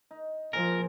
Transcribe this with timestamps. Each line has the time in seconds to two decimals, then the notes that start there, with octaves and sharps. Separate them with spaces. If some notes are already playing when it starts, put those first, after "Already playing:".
0.11 D#4
0.53 A#2 F3 F4 G#4 A#4